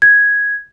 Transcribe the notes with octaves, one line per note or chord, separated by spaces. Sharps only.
G#6